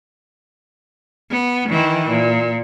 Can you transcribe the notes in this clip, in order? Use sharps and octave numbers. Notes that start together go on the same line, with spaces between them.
B3
D#3 E3
A#2